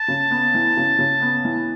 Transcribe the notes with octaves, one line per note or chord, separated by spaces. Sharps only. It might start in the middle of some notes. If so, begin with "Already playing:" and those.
Already playing: A5
C#3
B3
E3
C#3
C#3
B3
E3